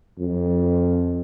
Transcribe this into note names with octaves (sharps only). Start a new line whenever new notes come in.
F2